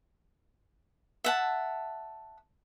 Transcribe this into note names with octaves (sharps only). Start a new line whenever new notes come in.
E5 F#5 A5